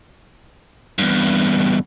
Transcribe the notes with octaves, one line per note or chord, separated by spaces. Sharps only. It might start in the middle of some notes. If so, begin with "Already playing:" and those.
E2 G2